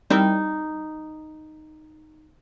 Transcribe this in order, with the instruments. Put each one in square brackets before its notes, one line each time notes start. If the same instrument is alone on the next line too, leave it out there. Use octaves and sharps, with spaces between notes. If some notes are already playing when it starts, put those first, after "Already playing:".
[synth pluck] G3 [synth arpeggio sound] C4 E4 A#4 [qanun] D#4